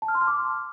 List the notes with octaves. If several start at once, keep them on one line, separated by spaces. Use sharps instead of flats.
A5
F6
C6
F6
D6